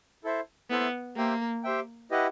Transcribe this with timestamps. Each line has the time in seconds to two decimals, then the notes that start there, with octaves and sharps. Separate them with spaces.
0.24 E4 A4 C5 E5
0.70 B3 E4 A4 C5 E5
1.17 A#3 G4 C5 E5 G5
1.64 G4 C5 E5 G5
2.11 E4 G4 B4 D#5 F#5